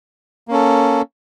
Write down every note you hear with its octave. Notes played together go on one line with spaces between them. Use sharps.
A#3 C#4 A4